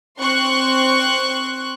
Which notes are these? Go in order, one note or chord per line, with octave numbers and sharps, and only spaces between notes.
C4 C6 C#6 F#6